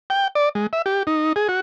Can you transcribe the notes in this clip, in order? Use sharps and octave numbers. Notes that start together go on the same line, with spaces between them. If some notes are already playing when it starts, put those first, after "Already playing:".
G5
D5
G#3
E5
G4
D#4
G#4
F#4